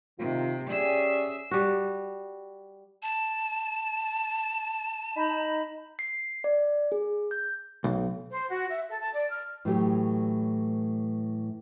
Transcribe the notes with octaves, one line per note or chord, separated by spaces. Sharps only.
C3 D#3 F4
C#4 G4 G#4 D5 E5 E6
G3 F#4
A5
D#4 B5
C7
D5
G#4
G6
B1
C5
F#4
E5
A4
A5
D5
F6
A2 E3 F#3 A3 G4